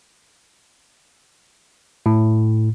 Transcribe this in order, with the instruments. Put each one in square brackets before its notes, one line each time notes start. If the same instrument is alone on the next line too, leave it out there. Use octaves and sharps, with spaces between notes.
[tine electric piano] A2